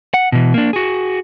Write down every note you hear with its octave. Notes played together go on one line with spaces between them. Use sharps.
F#5
B2 E3
A#3 D4
F#4 G#4